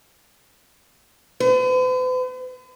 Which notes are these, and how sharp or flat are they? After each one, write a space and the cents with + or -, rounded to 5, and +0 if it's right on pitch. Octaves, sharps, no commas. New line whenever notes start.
B4 +45